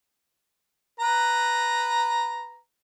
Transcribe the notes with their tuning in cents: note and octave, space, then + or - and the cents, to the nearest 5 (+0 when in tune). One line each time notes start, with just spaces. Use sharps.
B4 +0 A#5 +0